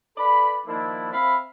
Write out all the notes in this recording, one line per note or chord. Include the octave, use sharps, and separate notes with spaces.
A4 B4 D5 B5
D#3 F3 A#3 D4 E4
C4 E5 F5 B5